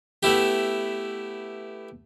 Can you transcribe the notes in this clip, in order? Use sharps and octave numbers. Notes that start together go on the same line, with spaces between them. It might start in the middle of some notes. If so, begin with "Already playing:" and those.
A3 B3 E4 G4